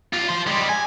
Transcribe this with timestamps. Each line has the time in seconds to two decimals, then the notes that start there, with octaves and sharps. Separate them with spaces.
0.13 F4 G4
0.29 F4 C5
0.47 G3 G#3
0.69 G#5